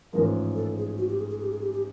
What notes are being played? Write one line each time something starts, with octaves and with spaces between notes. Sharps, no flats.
A1 G#2 F3 G#3 A#4
A4
G#4
F#4
G4
G#4
G#4
G4
G#4
G4
G4